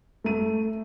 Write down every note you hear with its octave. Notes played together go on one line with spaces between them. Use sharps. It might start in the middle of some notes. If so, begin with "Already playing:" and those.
A3 D#7